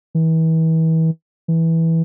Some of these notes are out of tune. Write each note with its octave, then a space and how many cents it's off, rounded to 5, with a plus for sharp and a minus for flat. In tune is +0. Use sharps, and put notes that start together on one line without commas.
E3 -35
E3 -10